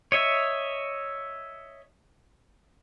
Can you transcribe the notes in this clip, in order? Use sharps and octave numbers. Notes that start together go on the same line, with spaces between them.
C#5 D#5 E5